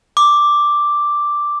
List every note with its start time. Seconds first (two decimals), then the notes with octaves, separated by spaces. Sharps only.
0.17 D6